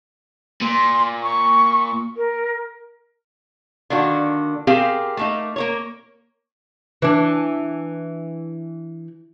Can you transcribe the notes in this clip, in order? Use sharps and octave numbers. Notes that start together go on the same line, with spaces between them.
A#2 C6
C#6
A#4
D3 D#3 A#3 D4 F#4
C4 G4 G#4 A#4 F5
A3 A#3 D#4
A#3 A#4 C#5
E3 D4